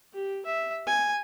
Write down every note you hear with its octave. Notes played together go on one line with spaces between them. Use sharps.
G4
E5
G#5